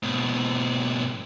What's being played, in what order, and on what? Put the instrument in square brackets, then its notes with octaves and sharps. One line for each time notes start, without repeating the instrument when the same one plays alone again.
[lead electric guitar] G#2 B2